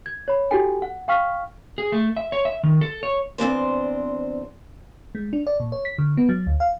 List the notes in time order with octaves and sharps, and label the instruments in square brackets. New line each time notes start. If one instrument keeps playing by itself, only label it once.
[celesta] G#6
C#5 B5
E4 F#4 G4 A4 G5 G#5
F#5
F5 G5 C#6 F6 B6
[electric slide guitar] G#4
A3
E5
C#5
E5
D#3
A4
C#5
[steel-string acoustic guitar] E2 C4 D4 C5
[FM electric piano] G#3
D4
D5
A#2
C#5
B6
D3
B3
F#3
D2
F5